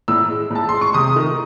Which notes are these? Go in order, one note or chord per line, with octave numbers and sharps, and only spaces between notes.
A2 E6
G#3
A2
A5
G#3 C6
C#6
C3 D#6
D#3 A3